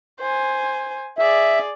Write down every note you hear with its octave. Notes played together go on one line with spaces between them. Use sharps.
C5 G#5
G#4 D5 E5